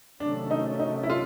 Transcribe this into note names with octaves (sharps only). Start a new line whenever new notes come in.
C3 D#3 F#3 A3 C#4 D4
D#4
D#4
E4
F4